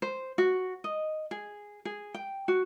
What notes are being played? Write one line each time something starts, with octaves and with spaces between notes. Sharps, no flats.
C5
F#4
D#5
G#4
G#4
G5
F#4